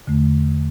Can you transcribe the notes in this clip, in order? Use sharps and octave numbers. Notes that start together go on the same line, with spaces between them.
E2 D3 A3